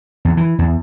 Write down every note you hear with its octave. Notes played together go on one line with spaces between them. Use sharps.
E2
E3
E2